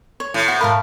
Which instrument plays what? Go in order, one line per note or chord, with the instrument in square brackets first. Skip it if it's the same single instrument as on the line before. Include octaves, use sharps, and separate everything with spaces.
[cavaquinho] C#5
[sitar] A2
[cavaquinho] F#4 C5
[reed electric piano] G#2 B5 [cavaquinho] A#4 F5 A5